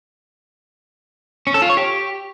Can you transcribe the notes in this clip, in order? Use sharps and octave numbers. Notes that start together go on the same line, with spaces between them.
C#4
A4
F4
C#5
G4